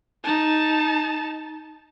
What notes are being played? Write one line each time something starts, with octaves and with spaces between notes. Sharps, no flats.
D#4 A5